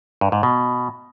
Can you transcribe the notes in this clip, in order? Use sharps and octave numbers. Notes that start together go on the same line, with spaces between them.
G2
G#2
B2